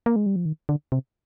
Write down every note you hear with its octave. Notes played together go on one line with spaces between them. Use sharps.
A#3
G#3
G3
F3
D#3
D3
C3